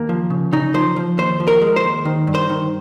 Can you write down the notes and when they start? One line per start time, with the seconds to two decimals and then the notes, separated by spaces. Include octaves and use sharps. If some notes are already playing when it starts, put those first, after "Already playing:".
Already playing: D#2 A#3
0.09 F3
0.30 C#3
0.52 C#3 D#4
0.74 F3 C5
0.96 F3
1.18 D#2 C5
1.40 F3
1.48 A#4
1.62 G#3
1.76 C5
1.83 D#2
2.05 D#3
2.27 G2
2.35 C5
2.50 D#3